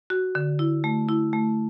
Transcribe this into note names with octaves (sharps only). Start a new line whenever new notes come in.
F#4
D3
E4
A3
E4
A3